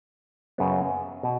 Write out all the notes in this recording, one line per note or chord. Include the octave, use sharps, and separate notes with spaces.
F#2 C#3 F#3 B3
B2